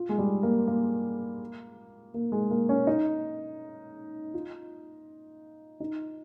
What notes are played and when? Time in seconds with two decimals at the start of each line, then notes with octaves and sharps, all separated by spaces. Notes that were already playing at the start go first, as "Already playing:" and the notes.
Already playing: F4
0.09 G#3
0.18 G3
0.43 A#3
0.67 A#3
2.14 A#3
2.32 G#3
2.51 A#3
2.69 C#4
2.87 D#4
4.34 F4
5.80 D#4